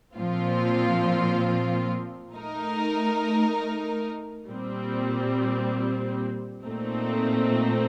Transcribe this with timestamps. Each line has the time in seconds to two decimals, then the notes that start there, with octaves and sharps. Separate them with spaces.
0.16 A#2 F3 C4 F4
2.34 A3 D#4 A#4
4.50 A#2 G3 C4
6.66 A#2 A3 C4 D#4